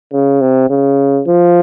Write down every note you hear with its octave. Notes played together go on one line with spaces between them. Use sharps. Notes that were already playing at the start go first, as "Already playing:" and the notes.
C#3
C3
C#3
F3